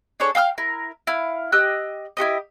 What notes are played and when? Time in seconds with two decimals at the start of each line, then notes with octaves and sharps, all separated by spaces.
0.20 D4 G#4 A4 C#5
0.35 F5 G5 E6 F6
0.58 E4 A#4
1.07 E4 F5
1.52 G4 D#5 E6 F#6
2.17 E4 F#4 G4 D#5